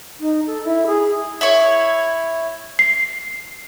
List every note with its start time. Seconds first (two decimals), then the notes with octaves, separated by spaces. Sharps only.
0.20 D#4
0.47 A4
0.65 E4
0.87 G#4
1.41 E4 C#5
2.79 C7